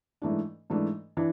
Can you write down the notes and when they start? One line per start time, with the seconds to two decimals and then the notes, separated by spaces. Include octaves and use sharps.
0.22 G#2 E3 A3 D4
0.70 G#2 E3 A3 D4
1.17 E3 D4